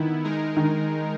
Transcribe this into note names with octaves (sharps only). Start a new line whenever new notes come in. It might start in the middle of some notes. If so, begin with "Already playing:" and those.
Already playing: D#3 B3 E4
G#3 D#4 A#4
D#3